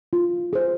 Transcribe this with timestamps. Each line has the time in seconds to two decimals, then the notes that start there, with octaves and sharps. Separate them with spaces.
0.13 F4
0.53 G#4 C5